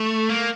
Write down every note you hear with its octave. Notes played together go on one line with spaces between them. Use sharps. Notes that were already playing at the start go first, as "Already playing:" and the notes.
Already playing: A3
A#3